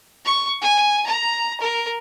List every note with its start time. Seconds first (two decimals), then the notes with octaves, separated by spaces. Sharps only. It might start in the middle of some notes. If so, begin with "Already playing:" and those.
0.25 C#6
0.61 G#5
1.06 A#5
1.60 A#4